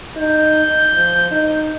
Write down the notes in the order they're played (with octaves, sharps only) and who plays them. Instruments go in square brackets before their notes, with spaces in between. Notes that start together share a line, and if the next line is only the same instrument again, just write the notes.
[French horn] D#4 [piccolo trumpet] G6
[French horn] F3
D#4